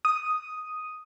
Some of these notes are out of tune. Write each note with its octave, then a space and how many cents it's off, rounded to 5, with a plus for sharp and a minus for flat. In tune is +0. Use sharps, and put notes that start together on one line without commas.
D#6 +0